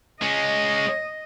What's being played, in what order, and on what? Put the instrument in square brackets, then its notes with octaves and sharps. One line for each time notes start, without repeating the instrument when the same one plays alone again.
[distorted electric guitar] G#3 C#4 [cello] D#5